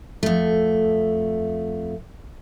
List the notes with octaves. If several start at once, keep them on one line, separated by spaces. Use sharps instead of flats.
F2 A3